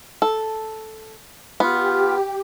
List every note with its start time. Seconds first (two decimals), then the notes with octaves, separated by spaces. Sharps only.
0.22 A4
1.60 B3 F4 G4